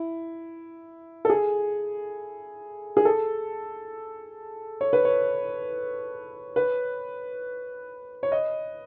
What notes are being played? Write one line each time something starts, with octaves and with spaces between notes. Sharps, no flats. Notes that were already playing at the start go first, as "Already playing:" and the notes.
Already playing: E4
A4
G#4
G#4
A4
C#5
B4
C#5
B4
C#5
D#5